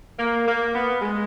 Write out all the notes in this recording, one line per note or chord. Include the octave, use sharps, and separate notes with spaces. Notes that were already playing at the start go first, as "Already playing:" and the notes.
A#3
A#3
B3
G#3